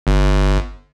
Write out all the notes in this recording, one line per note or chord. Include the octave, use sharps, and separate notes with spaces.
G1